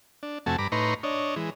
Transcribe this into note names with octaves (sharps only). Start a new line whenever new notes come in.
D4
F2 C3 A3 F#4 G#5 A5
G2 A#5 B5 D6
A2 D#4 B4 A#5 C6 C#6
D4 C#5 D#5
E3 G#3